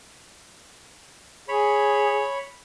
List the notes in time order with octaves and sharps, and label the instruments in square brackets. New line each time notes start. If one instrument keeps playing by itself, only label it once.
[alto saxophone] G#4 [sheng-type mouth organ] C#5 B5